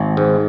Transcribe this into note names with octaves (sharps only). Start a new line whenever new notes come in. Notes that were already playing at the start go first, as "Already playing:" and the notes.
Already playing: G#1
G#2